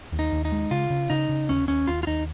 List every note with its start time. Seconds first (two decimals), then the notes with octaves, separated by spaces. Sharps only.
0.12 D#2
0.19 D#4
0.32 D#2
0.45 D#4
0.52 G#3
0.71 C#3 F4
0.90 C#3
1.10 C#3 D#4
1.29 C#3
1.49 D#2 C#4
1.68 D#2 C#4
1.87 D#2 F4
2.03 F4
2.07 D#2 D#4